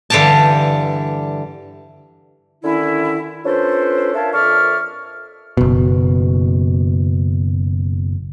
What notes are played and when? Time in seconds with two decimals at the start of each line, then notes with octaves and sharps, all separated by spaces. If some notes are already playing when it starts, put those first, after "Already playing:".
0.10 G2 D3 E3 G4 G5 A5
2.64 D3 D#3 C#4 E4
3.45 C#4 D4 F4 A4 B4 C5
4.15 A#4 C#5 E5 F5 A5
4.34 F2 A#4 D5 E5 C#6 F6
5.57 F#1 B2